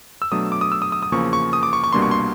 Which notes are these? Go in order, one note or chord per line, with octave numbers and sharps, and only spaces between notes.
E6
B2 F#3 A3 D4 D#6
D6
D#6
E6
D#6
D#6
D#6
E2 C#3 F3 A#3 C#6
C#6
D#6
D6
C#6
C#6
C2 B2 G3 A#3 D4 C6
C#6
C6